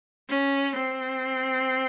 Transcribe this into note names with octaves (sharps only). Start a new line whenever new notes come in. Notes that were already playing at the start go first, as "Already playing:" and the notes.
C#4
C4